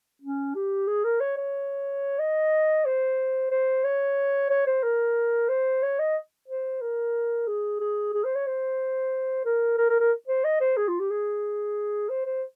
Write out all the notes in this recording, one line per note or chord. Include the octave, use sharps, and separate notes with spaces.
C#4
G4
G#4
A#4
C#5
C#5
D#5
C5
C5
C#5
C#5
C5
A#4
C5
C#5
D#5
C5
A#4
G#4
G#4
G#4
C5
C#5
C5
A#4
A#4
A#4
A#4
C5
D#5
C5
G#4
F4
G4
G#4
C5
C5